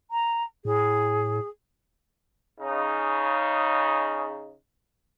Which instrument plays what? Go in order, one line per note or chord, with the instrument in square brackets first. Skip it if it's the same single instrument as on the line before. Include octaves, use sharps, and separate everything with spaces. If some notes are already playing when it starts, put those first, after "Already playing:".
[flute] A#5
[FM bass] A2 [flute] G#4
[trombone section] C#3 D#4